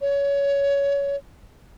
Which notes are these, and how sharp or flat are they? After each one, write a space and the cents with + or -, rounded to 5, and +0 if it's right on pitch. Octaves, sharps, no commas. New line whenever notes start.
C#5 +20